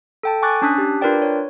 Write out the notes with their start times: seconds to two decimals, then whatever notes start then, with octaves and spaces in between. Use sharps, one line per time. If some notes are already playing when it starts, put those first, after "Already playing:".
0.23 A4 G5 A5
0.42 G#5 C#6 D6 F#6 A6
0.62 C#4 D4 A5 D#6 F#6 B6
0.78 G4
1.01 D4 F4 A#4 B4 D5 G5
1.22 C#5